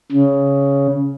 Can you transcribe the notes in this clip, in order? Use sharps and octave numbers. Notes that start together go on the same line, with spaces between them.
C#3